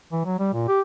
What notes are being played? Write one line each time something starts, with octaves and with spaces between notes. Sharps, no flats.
E3
F#3
G3
A#2
G4